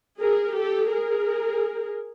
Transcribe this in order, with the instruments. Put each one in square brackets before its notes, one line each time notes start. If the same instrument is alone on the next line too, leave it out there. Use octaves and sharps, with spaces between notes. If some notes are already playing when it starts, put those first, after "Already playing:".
[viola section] G#4 A#4
G4 A4
G#4 A#4